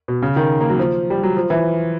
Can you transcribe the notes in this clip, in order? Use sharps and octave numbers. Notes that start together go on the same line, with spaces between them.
B2
C#3
D#3
A#3
F#3
F3
G3
F#3
F3
E3